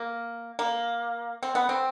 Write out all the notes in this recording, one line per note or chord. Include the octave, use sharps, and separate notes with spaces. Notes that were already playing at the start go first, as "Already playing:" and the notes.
Already playing: A#3
A#3
C4
B3
C4